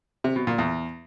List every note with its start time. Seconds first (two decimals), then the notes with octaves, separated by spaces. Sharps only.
0.24 C3
0.36 B2
0.47 A#2
0.58 E2